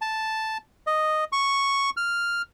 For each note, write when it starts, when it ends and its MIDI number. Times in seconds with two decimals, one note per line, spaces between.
0.01 0.58 81
0.87 1.24 75
1.32 1.90 85
1.97 2.42 89